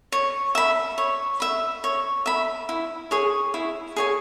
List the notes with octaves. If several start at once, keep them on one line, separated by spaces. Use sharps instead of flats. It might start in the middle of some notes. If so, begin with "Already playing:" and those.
C#5
E5 B5
C#5
E5 B5
C#5
E5 B5
E4
G#4 C#5 G#5
E4
G#4 C#5 G#5